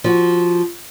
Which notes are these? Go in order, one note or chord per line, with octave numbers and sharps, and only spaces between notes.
F3 F#4